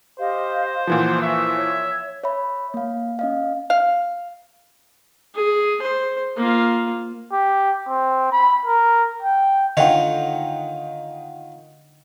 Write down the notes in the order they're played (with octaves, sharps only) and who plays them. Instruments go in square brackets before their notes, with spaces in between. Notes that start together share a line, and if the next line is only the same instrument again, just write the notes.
[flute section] G4 D#5 F5 [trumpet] C5
[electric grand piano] A#2 E3 F3 [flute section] F#5
[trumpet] E5 [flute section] C#6
[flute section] C#5
[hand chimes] C#5 E5 B5
A#3 F5
C#4 D#5 F5
[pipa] F5
[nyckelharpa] G#4
C5
A#3 F4
[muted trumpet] G4
C4
B5
A#4
G5
[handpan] D3 D#4 [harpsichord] D#3 F4 C#5 [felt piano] D#5 F#5 G5